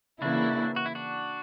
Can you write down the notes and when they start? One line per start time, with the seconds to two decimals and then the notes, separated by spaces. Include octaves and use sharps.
0.22 C#3 E3 A#3 D4 E4 F#4
0.76 F#4
0.86 E4
0.95 D4 F#4